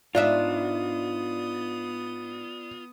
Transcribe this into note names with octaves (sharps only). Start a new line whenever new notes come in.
G#2 B3 D4 F4 D5 E5 D#6